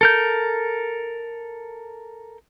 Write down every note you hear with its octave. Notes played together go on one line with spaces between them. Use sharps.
A4 A#4 G6